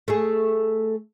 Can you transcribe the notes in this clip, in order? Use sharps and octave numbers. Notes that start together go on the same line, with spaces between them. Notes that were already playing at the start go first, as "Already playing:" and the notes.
A3 G#4